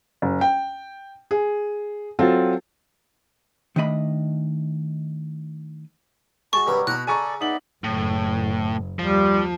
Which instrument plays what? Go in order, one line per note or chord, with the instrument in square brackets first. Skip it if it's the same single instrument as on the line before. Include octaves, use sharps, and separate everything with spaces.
[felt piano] F#1
G5
G#4
F#3 C4 F4 A4
[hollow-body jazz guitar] D#3 A3 D4 D#5 B5
[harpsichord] G#3 F#4 [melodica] A5 [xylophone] C#6
[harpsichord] C2 G2 B4 [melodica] F#3 G3
[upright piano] B2 [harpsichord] A#5 B5 [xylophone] F#6
[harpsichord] C#3 [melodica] A4 D5 [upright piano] G#5 A#5 C#6
[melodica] B3 D5 E5 [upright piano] D#4 F#7
[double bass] F#1 [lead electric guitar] A2
[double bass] D#2 [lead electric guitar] F3 [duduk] G3